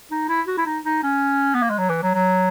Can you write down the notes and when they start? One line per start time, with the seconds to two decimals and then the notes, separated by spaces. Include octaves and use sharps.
0.11 D#4
0.29 E4
0.47 F#4
0.57 E4
0.66 D#4
0.85 D#4
1.03 C#4
1.54 B3
1.62 A#3
1.70 G#3
1.78 F#3
1.89 E3
2.03 F#3
2.14 F#3